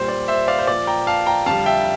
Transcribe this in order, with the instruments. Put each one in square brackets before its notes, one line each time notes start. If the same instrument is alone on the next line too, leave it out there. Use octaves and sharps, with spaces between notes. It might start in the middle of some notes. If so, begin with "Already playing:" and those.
Already playing: [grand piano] A#2 G3 C5
D5
C5 E5
D5 F5
C5
A#2 F3 D5
G5 A#5
F5 A5
G5 A#5
F2 D3 G3 F5 A5
E5 G5